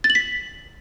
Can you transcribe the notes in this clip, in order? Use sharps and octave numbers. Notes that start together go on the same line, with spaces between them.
A6
F#7
B6